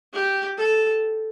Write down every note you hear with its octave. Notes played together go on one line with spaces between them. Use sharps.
G4
A4